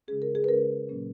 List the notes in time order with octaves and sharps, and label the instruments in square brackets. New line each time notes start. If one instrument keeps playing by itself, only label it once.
[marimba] C#3 G#3 C#4 G#4
A#4
G#4
B4
C#3 G#3 C#4 A#4
A#2 F#3 A#3 C#4